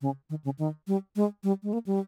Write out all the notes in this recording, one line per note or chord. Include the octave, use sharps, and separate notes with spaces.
C#3
D#3
C#3
D#3
G3
G#3
G3
G#3
A#3
G3